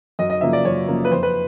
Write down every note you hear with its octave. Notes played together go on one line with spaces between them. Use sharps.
F#2 D#5
D#5
C#3 F3 A#3 E5
D5
F#2 C#5
C#3 F3 A#3
B4
F2 C5
B4